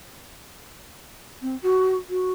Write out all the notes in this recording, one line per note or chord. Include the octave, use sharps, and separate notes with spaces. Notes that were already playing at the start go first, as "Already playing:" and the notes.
C4
F#4
F#4